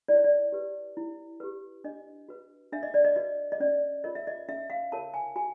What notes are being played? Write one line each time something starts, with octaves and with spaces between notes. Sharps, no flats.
E4 D5
C#5
D5
G4 B4
E4
G4 B4
D4 D#5
F#4 B4
D4 E5
D#5
D5
D#5
F#4 B4 D#5
D#5
C#4 D5
F4 A#4 C#5 D#5
E5
D#5
C#4 E5
F5
F4 A#4 C#5 A5
G#5
F#4 G#5